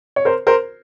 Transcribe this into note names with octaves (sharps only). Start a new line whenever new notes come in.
C#5
A#4 C5
A#4 C5